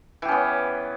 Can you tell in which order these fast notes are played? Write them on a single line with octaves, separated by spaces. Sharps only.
E3 G4 C#4 B3